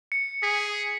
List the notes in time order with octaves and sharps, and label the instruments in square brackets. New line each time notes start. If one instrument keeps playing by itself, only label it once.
[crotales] C#7
[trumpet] G#4 [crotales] B6